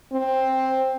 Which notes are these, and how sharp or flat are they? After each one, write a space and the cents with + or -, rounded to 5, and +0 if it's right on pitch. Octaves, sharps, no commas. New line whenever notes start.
C4 +10